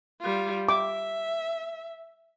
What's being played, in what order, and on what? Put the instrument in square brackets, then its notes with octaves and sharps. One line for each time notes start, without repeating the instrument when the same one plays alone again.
[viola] G3 F4
[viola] E5 [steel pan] D6